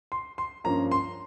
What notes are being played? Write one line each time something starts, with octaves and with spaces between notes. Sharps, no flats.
C6
C6
G2 F3 A#3 C#4 A#5
C6